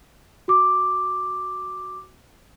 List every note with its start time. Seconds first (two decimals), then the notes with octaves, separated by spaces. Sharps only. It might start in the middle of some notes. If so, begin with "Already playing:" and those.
0.48 F#4 D6